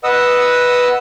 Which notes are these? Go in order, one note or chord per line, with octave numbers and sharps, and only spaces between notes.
B4 D#5 F#5 D#6 E6